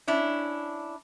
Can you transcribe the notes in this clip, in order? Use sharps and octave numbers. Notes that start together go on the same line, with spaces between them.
C#4 D4 E4